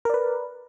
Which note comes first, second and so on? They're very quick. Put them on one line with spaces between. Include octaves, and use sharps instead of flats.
A#4 D5 B4